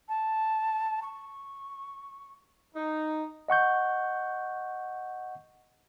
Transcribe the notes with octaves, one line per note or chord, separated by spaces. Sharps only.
A5
C#6
D#4
D#5 F#5 C#6 G6